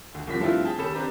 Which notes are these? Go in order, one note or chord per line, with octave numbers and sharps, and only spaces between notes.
D2
C2 F#2 F3 G3 B6
G2 F3 A3 C4 E4 F4
G#4 G5 A5
D#2 C#3 G4 A4 B5 E7
C4 D4 G4 B4 A#5